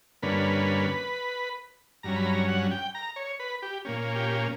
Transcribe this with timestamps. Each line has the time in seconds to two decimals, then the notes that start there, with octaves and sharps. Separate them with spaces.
0.22 G2 D3 A#3 C#4 B4
2.03 G2 F#3 C#4 A#5
2.16 B5
2.26 A#5
2.48 F#5
2.71 G5
2.95 A#5
3.16 C#5
3.40 B4
3.62 G4
3.85 A#2 A#3 C#4
4.15 G4